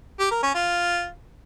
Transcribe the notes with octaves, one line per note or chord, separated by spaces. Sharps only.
G4
A#4
C#4
F4